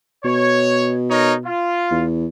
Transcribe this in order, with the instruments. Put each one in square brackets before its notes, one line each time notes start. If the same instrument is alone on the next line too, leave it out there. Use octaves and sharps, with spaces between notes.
[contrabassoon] B2 [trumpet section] C#5
[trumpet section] D#4 A#4 C#5
F4
[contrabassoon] E2